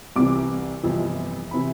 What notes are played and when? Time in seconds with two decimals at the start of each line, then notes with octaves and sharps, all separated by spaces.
0.16 C2 C3 E3 D6
0.83 G1 F2 C3 E3
1.51 C3 E3 B5